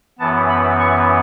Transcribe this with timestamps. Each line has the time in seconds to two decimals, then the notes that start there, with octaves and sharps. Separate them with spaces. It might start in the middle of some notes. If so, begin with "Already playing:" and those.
0.19 F#2 E3 B3 A5
0.49 B5
0.79 C#6